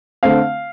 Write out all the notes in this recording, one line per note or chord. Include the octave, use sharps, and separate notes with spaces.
D3 A3 C4 F5